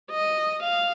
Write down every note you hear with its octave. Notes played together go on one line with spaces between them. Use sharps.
D#5
F5